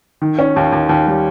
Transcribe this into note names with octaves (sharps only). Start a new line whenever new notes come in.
D#3
C#4
D#2
D#2
D#2
G3